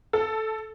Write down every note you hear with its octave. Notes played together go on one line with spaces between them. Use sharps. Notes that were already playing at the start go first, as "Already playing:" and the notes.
A4